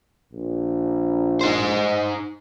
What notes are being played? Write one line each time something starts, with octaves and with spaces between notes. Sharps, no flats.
A#1
D#4 C5